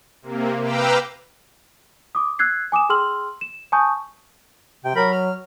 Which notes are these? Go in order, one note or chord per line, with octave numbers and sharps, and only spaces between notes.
C3 A#3
B4 F5 G5 A#5 D6 E6
D6 D#6
E6 F#6 G#6 C7
G#5 D6 D#6 E7
G#4 G5 C6 E6 F6 F#7
E7
G#5 A5 C#6 D#6 G6
C3 G5
F#3 A#4 B5
F6